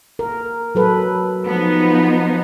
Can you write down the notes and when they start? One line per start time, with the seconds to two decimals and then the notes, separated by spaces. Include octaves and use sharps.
0.19 A#4
0.75 F#3 A4 B4
1.44 F3 B3 D#4